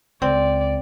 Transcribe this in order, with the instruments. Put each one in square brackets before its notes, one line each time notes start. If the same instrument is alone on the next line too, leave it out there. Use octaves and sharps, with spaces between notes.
[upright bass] C#2 [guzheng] C4 [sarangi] D5